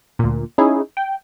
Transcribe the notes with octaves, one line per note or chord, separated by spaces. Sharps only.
D2 A#2
C#4 D#4 E4 G#4
G5